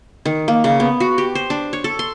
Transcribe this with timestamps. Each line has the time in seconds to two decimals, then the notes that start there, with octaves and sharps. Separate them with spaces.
0.26 D#3
0.48 A#3
0.64 C#3
0.80 B3
1.00 F#4
1.18 G4
1.35 C5
1.50 D4
1.73 C#5
1.84 A4
1.99 C6